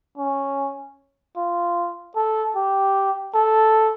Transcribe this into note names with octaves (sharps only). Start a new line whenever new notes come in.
C#4
F4
A4
G4
A4